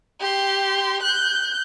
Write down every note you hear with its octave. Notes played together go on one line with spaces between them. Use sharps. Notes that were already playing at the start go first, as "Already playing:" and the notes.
G4 C6
F#6 G6